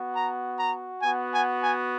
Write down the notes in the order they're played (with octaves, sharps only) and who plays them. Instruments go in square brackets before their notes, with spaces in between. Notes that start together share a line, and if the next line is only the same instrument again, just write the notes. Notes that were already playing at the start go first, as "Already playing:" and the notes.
Already playing: [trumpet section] B3 F#4
A#5
A#5
B3 F#4 G#5
G#5
G#5